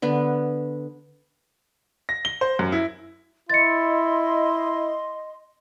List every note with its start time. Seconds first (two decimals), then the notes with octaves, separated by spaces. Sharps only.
0.02 D3 B3 B4
2.09 A#6
2.25 G7
2.41 C5
2.59 F#2
2.72 E4
3.50 E4 D#5 C6 A6 C#7